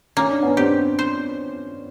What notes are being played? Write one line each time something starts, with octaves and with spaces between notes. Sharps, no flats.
A#3 C#4
D4
B3 C#4
C4 D4 G4
C5